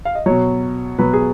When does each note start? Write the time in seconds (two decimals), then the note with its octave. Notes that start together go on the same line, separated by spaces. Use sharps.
0.05 F5
0.15 D#5
0.26 B2 F#3 C#5
0.98 B2 F#3 B4
1.13 G#4